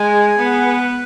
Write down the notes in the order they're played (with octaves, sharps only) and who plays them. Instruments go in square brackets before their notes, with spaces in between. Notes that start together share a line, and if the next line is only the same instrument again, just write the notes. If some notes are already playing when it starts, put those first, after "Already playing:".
Already playing: [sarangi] G#3 [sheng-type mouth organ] G#5
[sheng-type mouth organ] G#4
[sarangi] B3 [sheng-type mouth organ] F#5
[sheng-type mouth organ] B4